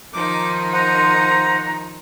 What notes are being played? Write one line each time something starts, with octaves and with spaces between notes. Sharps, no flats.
D#3 F3 D#4 D6
C5 F#5 A#5